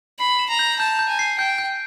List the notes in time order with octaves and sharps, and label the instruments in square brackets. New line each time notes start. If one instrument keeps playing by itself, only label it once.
[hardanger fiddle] B5 [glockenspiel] C7
[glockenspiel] E7
[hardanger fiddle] A#5
[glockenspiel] G6
[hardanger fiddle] A5 [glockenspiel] G6
[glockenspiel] G6
[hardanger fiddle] G#5
[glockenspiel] C7
[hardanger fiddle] G5 [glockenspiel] G6
[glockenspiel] G6